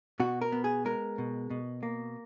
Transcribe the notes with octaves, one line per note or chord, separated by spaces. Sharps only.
B2 F#4
A#4
B3
G#4
G#3 A#4
B2
B2
A#3